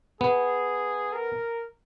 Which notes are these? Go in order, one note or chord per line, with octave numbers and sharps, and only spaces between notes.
B3 G#4
A#4